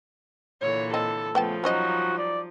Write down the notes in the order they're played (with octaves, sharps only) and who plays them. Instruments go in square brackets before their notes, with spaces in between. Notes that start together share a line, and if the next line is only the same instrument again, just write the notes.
[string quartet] A#2 D3 E3 [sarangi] C#5
[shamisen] C4 D#5 [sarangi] A4
[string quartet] C#3 A3 [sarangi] F3 [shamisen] B3 G5 A5
[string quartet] F#3 G3 D#4 [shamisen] C#4 C5 D#5 [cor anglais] F#4
[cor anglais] D5